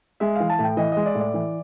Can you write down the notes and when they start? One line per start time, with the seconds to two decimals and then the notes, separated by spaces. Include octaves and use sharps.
0.20 G#3 E5
0.36 E3 F5
0.50 A5
0.59 A2 G5
0.77 E3 D#5
0.92 G#3 D#5
1.06 D5
1.15 A2
1.20 D5
1.34 E3